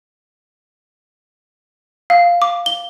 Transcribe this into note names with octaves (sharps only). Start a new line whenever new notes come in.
F5
D6
G7